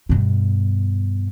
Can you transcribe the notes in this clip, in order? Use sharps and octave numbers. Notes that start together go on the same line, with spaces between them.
G2 B2